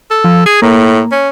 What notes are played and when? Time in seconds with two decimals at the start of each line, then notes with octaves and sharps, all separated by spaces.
0.10 A4
0.24 F3
0.46 G#4 G#6
0.62 A2 A#3
1.12 C#4